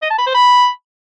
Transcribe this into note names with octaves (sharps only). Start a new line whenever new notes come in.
D#5
A5
B5
C5
B5